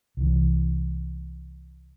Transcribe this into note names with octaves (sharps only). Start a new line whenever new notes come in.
C2 E3